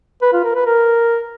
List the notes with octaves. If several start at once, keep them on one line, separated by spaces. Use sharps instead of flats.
B4
F4
A#4
B4
A#4